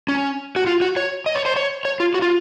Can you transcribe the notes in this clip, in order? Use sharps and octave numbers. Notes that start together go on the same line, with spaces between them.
C#4
F#4
F4
F#4
C#5
D#5
C#5
C5
C#5
C#5
F4
F#4
F4